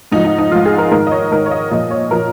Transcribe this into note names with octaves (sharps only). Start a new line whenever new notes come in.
G#2 F3 D#4
D#4
D#4
G#2 F3 F4
G#4
A#4
G#2 D#3 A#4
D#5
C#5
G#2 D#3 A#4
C#5
D#5
A#2 F3 D#5
C#5
A#2 F3 A#4